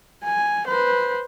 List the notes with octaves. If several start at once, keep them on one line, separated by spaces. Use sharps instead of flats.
G#5
B4 C5